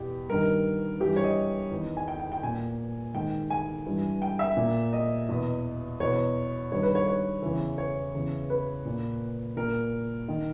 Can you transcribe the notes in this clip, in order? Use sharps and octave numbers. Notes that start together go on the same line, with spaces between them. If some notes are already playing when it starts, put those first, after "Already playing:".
Already playing: E2 B2 G4
G2 D#3 A#4
G2 E3 G4
C#5
D#5
E2 D#3
G#5
G5
G5
G5
A#2 G#5
G#2 D#3 G5
G#5
G2 E3
G5
E5
A#2
D#5
E2 B2
E2 B2 C#5
G2 D#3 C#5
B4
C#5
C#5
E2 C#3 E3
C#5
E2 C#3 E3
B4
A#2
A#2 A#4
D#3